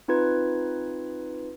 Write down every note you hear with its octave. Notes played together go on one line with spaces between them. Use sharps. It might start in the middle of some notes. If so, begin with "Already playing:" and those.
C4 D#4 F4 B4 G#6